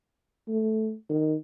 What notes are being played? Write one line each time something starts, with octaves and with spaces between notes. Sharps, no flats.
A3
D#3